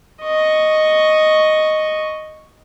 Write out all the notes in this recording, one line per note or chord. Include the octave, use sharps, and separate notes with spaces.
D#5 C#6